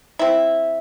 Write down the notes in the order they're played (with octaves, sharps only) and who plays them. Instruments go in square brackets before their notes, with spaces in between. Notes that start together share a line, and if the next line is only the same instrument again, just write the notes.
[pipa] C4 E4